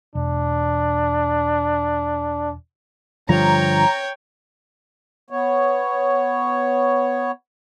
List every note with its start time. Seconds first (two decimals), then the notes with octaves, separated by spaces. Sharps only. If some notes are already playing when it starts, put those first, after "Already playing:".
0.15 E1 D4
3.29 G2 D3 F3 C#5 G5 A#5
5.30 B3 C#5